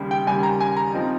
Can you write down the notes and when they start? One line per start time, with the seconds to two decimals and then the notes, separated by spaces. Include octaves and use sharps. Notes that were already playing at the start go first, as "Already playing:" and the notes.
Already playing: D#2 C#3 G3
0.11 G5
0.27 D#2 C#3 G3 G#5
0.43 A#5
0.60 G#5
0.76 A#5
0.93 F3 C4 D#4